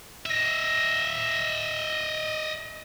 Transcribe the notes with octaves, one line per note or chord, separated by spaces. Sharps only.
D#5 E5